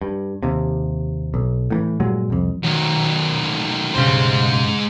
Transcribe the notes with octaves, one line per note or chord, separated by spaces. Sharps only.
G2
D#2 C3
B1
A2 D#3 E3
G2 A#2 F#3 G#3
C2 F2
D#3 F#3
B1 G2 C#3 G#3 C5